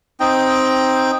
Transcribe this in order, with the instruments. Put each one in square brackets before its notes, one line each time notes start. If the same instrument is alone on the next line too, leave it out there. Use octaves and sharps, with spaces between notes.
[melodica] C4 D#4 G5